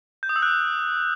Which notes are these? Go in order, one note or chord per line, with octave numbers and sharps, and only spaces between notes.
G6
D#6
E6
F#6